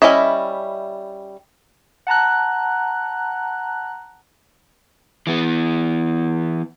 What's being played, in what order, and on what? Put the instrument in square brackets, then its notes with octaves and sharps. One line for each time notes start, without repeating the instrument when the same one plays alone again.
[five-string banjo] G3 C#4 E4 D#5 E5
[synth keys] F#5 A5 A#5 F#6
[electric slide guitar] E3 B3